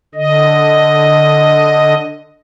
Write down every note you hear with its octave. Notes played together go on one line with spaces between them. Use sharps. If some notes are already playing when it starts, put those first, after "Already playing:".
D3 D#5